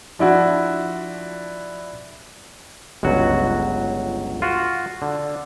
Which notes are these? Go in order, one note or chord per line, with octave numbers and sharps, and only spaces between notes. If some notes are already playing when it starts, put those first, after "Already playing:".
F3 D4 E4 F#4
G1 C#2 F#3 F#4
F4 F#4
D3